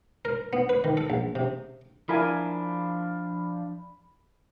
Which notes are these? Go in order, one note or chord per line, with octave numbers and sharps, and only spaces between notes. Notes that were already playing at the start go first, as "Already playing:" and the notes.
A#4
B3
B4
D#3
A4
A#1
C3
F3 D4 E4 A#4 G#5 B5